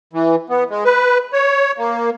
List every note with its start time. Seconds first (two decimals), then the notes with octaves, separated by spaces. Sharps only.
0.13 E3
0.50 B3
0.70 G#3
0.85 B4
1.33 C#5
1.78 A#3